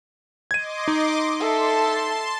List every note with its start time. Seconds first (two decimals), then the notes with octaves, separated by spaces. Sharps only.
0.51 D#5 C6 D6 G#6 D#7
0.88 D#4
1.40 A4 E5 A5 C6